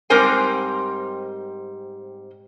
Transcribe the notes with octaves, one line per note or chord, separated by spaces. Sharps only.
G#2 G3 C4 A#4 C5 G#5